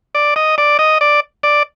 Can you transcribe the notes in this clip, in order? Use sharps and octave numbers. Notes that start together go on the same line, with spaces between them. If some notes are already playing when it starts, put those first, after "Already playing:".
D5
D#5
D5
D#5
D5
D5